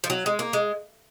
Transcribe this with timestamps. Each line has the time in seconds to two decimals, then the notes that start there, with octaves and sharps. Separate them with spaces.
0.04 F3
0.10 F#3
0.26 G#3
0.39 A#3
0.53 G#3